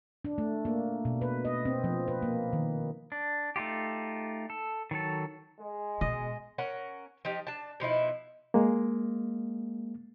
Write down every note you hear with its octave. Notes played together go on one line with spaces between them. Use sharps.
D4
A3
A#3
B2
B4
D#5
C4
F3
B4
A#3
D#3
D4
A3 D#4 F4 G4
A4
D#3 F#3 A4
G#3
B2 D#5
C#4 A#4 F#5
F3 D#4 G4
D4 A5
B2 F3 D#4 E4
G#3 A#3